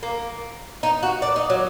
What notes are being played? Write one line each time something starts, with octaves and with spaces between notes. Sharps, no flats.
A#3
D#4
F#4
D4
D#4
F#3